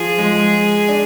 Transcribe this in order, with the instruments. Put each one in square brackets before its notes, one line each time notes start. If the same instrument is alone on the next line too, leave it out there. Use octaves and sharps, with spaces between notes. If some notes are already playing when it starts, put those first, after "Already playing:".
Already playing: [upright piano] F3 [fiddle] G#4
[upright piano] G#3
D4